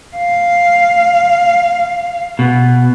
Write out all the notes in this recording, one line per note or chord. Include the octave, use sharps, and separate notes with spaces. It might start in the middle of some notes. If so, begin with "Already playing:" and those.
F5
B2